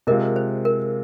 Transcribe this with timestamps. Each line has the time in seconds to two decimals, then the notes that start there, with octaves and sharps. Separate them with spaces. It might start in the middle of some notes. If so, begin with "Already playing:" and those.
0.07 C3 G#3 F4 A#4 D#5
0.36 C5
0.65 A#4